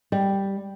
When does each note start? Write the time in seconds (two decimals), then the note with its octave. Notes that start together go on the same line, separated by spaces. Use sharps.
0.12 G3